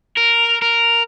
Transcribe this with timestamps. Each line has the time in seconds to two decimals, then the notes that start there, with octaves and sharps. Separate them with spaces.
0.17 A#4
0.62 A#4